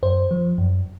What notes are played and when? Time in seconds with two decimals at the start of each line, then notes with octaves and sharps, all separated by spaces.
0.03 F#2 C5
0.31 F3
0.58 F#2